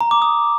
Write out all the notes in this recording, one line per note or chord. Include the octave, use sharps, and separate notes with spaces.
A#5
D6
D#6